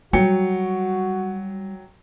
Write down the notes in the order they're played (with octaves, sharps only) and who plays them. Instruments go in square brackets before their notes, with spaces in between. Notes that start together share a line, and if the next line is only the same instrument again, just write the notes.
[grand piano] F#3 G5 C#7 [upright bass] G3 [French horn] F#4